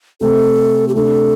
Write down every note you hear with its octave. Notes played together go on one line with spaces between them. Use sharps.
C3 A3 C4 A4
G4
C3 A3 D4 A4